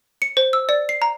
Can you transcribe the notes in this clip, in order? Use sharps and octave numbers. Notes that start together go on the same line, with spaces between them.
C#7
C5
E6
D5
C7
A#5